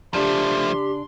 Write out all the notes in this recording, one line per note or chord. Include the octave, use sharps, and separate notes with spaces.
C#3 F3 A3 D4 G4 C6